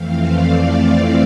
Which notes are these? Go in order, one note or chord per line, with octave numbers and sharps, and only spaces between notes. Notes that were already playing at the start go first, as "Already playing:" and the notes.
Already playing: F2 E3 A3 C4 F5
D5